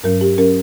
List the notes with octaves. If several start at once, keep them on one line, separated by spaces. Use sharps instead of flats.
G2 F#3 C#4 A#4
G4
F#3 C#4 A#4